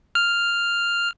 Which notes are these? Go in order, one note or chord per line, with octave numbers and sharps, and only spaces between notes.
F6